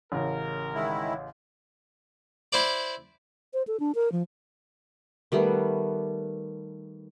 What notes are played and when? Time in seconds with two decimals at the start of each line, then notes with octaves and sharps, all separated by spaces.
0.12 A1 C#3 A#4
0.74 D#3 G#3 E4
2.53 E4 C5 D5
3.54 C5
3.67 A4
3.80 D4
3.95 A#4
4.12 F3
5.32 D#3 G3 A3 B3